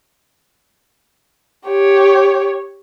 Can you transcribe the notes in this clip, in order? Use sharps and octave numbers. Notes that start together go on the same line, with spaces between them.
G4 C#5